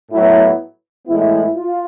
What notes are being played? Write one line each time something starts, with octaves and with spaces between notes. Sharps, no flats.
A2 F#3 B3 E4
A2 E3 G#3 B3 E4
F4